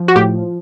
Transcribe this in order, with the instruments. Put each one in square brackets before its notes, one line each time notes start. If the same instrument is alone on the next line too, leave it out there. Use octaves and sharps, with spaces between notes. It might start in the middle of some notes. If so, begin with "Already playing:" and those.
Already playing: [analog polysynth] F3
F#4
A2 G4